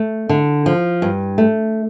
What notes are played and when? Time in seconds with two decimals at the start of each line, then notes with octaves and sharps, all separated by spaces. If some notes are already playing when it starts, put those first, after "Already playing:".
Already playing: A3
0.29 D3
0.66 F3
1.02 G2
1.38 A3